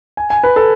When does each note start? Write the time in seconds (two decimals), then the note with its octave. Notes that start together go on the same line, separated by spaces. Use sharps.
0.17 G#5
0.30 G#5
0.44 B4
0.56 A4